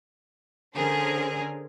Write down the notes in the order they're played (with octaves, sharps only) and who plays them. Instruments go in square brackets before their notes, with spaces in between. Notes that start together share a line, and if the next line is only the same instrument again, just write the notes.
[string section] D3 C#4 G#4 A#4 C5